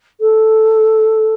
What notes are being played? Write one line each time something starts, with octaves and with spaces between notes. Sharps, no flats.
A4